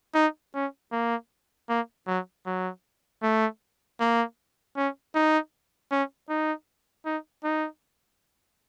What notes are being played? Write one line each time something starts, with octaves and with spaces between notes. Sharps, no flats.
D#4
C#4
A#3
A#3
F#3
F#3
A3
A#3
C#4
D#4
C#4
D#4
D#4
D#4